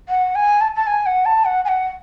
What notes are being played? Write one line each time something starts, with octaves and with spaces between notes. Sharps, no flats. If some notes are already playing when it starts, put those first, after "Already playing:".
F#5
G#5
A5
A5
G#5
F#5
A5
F#5
G#5
F#5